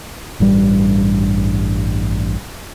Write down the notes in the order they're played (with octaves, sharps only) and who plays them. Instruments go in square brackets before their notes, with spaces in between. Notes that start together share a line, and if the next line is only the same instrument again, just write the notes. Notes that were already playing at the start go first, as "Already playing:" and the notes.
[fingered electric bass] A1 G2 G3